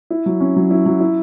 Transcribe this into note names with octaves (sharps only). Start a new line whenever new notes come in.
E4
F#3
C#4
F#3
E4
F#3
E4